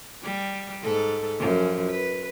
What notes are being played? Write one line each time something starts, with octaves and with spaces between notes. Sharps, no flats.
G3
G#2 A4
F#2 F3
B4